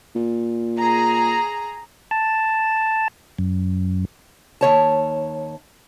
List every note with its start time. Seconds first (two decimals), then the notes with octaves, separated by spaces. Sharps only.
0.15 A#2
0.79 G#4 A#5
2.11 A5
3.39 F#2
4.61 D#2 C#5 A5